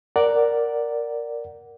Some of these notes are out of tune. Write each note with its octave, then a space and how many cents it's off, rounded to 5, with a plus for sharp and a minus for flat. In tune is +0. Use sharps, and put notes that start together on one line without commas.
A#4 +0 D5 +0 F#5 +5